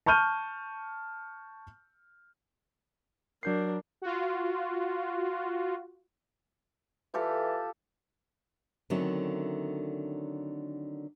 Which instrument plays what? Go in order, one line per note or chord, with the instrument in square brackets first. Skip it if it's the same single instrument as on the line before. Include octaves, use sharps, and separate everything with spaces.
[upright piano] A5 C#6 F6 G6 D#7
[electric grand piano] F#3 G6 C7 [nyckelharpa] D4 A#4
[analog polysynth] F4 F#4
[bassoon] E3 [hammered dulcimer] F4 G4 A4
[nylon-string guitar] D3 D#3 F#3 A3 C4 C#4